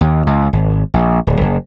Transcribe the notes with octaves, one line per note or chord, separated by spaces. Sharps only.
D#2
C#2
G#1
A#1
D1
F#1